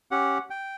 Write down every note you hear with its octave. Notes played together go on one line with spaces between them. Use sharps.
C#4 G4 F#5
G5